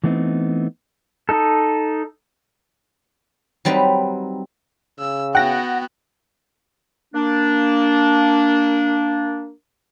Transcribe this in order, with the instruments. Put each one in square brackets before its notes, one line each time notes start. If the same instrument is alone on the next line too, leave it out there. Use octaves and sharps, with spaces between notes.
[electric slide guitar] E3 A3 B3 C4 D#4
[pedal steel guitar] D#4 A4
[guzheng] F#3 G3 C4 D#4 B4
[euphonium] C#3 [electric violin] E6
[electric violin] B3 F#4 [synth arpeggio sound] F#5 A#6 [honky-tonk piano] G5
[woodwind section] A#3 D4